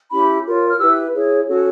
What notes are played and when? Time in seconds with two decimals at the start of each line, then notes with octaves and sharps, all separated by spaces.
0.11 C#4 E4 G4 B5
0.46 F4 A#4 C#5
0.70 F6
0.79 E4 G4 B4 E6
1.13 E4 G#4 C#5
1.47 C#4 F#4 A4 C#5